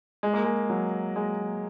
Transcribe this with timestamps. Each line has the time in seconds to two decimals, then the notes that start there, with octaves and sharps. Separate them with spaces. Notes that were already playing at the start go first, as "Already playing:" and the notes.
0.23 G#3
0.34 A#3
0.45 G#3
0.70 F#3
1.16 G#3